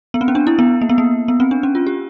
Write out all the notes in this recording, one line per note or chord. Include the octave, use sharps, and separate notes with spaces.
B3
C4
C#4
D4
E4
B3
A#3
B3
A#3
B3
C4
D4
C#4
F4
G4